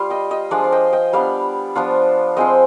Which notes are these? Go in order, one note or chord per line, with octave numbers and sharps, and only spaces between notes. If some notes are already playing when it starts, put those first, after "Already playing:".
Already playing: G3 F4 F5
D#5 G5
D#5 G5
F3 G#3 D4 D5 F5
F5
D#5 G5
D#5 G5
G3 B3 D4 D5 F5
F3 B3 D4 F4
F3 G#3 C4 D#5 G5